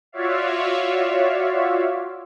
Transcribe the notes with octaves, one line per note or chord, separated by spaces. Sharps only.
F4 F#4 C#5 D5 E5 F5